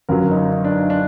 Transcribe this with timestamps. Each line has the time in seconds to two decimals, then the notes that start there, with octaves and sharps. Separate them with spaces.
0.09 G1 F#2 F#3 A#4
0.31 D#4
0.52 D#4
0.65 D4
0.90 D4